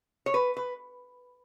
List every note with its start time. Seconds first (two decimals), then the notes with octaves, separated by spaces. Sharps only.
0.26 C#5
0.34 B4
0.57 B4